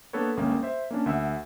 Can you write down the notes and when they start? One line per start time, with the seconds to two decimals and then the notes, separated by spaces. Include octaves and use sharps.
0.13 A#3 B3 D4 A4 B4 C#5
0.37 G1 C#2 A#3 C#4
0.63 C5 E5
0.91 A#3 C#4 D4
1.06 D2 E5 F#5 E6